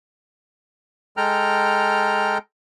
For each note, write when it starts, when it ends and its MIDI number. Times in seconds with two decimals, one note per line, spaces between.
1.17 2.38 56
1.17 2.38 69
1.17 2.38 79
1.17 2.38 82
1.17 2.38 89